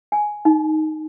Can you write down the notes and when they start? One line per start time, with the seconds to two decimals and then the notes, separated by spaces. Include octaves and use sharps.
0.12 G#5
0.45 D#4